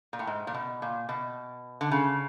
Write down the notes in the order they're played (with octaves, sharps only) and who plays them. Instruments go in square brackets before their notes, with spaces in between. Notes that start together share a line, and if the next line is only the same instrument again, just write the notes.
[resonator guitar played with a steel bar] A#2
A2
G#2
A#2
B2
A#2
B2
D3
C#3